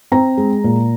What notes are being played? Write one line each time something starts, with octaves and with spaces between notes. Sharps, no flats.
C4 A#5
G#3
A#2